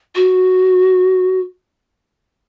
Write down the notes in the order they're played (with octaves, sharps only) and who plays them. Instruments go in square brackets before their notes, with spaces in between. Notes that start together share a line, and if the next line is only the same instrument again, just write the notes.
[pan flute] F#4